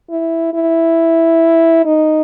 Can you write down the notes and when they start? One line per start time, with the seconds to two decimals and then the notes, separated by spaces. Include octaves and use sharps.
0.10 E4
0.54 E4
1.85 D#4